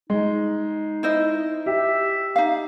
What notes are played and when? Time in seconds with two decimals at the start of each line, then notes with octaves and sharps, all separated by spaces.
0.10 G#3 D#4
1.03 E4 C5 D#5
1.66 G4 E5
2.36 D#4 F5